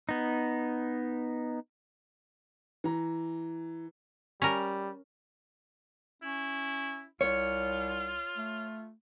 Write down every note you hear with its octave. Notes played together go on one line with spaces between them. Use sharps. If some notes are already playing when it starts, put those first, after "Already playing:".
B3 D#4
E3 A#5
G3 C#4 A#4
C#4 E4
C2 F4 C#5
A3